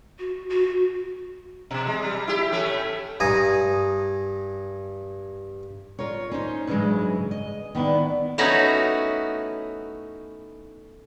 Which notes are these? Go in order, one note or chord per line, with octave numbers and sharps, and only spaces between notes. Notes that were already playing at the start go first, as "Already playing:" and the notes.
F#4
F#4
B2
G#3
G3
E4 G4
A2 A3 C#4
G2 G#5 A#5 D#6
F4 A#4 C#5
C#4 D#4 C5
G2 C#3 E3 F#3 G#3
D#5
D#3 B3 D4 E4
A3 B3 C#4 D#4 E4 F#4